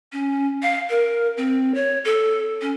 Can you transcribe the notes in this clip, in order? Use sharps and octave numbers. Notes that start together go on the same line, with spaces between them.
C#4
F5
A#4
C4
C#5
A4
C#4